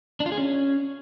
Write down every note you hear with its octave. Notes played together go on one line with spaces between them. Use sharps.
D4
F4
G#4
C#4